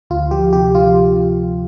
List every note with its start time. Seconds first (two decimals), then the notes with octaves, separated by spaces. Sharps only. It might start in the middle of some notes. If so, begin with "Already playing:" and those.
0.10 D2 F4
0.31 F3 G4
0.53 C3 G4
0.75 F3 F4